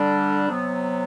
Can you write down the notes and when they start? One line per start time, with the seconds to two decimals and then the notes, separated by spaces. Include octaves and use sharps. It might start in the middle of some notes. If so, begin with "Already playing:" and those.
Already playing: D3 G3 D4
0.48 C3 F#3 B3